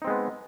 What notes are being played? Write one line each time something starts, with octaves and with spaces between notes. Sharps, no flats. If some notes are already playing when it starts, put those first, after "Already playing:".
G#3 B3 C4 D#4